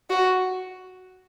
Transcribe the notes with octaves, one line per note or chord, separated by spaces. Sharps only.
F#4